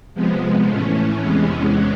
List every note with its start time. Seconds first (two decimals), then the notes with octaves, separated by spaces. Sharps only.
0.14 C3 F3 G#3 B3
0.67 A2 E3 A3 C#4
1.20 E2 C3 E3 G#3 B3